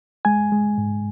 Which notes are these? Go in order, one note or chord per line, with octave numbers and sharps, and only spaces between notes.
G#3 G#5
G#3
G#2